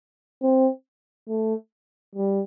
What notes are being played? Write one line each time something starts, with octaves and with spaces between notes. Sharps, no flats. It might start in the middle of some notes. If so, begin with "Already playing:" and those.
C4
A3
G3